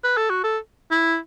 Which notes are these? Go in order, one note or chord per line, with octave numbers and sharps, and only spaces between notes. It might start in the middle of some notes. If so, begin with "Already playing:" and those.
B4
A4
F#4
A4
E4